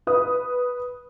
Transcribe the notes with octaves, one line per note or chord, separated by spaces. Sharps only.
B4 D#6